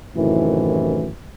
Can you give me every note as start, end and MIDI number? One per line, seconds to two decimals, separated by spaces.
0.15 1.08 42
0.15 1.08 45
0.15 1.08 48
0.15 1.08 51
0.15 1.08 52